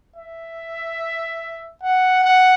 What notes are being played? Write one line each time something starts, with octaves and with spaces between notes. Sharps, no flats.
E5
F#5
F#5